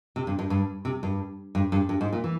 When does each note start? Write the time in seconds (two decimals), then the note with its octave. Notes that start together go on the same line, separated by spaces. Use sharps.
0.16 C3
0.27 G2
0.39 G2
0.50 G2
0.85 C3
1.03 G2
1.55 G2
1.72 G2
1.89 G2
2.01 G#2
2.13 A#2
2.24 E3